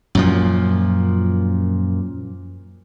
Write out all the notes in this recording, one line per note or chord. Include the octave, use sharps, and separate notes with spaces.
F#2 A#2 F3